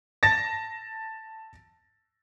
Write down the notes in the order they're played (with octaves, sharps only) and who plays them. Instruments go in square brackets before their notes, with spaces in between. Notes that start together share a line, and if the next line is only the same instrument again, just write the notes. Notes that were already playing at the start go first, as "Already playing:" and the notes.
[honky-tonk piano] A5 A6 A#6